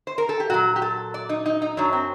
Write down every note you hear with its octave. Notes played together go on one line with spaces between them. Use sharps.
C5
A#4
A4
G4
A#2 F#3 F#4
G4
A4
D5
D#4
D#4
D#4
F#2 F#3 D4
C4